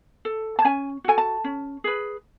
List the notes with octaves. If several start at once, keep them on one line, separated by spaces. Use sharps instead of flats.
A4
A5
C#4 G#5
F#4 A4 G#5
A5
C#4
G#4 B4